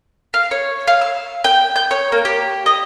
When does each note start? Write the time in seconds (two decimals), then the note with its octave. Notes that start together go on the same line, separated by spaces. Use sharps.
0.34 F5
0.51 C#5
0.88 F5
1.01 E6
1.44 G5
1.76 G6
1.91 C#5
2.12 A#3
2.25 G4
2.66 D#5